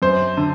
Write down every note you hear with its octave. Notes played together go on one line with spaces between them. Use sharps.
F#2 C5
D3